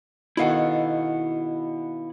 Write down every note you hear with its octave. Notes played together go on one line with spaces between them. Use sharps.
B2 D#3 E4 A4 F5 F#5